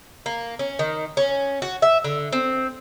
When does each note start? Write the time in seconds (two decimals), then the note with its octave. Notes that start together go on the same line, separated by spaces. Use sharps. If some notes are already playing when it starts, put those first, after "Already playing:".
0.26 A#3
0.59 C#4
0.79 D#3
1.17 C#4
1.62 F#4
1.82 E5
2.04 D3
2.32 C4